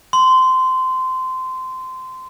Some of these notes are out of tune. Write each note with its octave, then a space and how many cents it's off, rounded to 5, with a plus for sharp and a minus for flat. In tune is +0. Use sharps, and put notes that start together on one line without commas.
C6 -20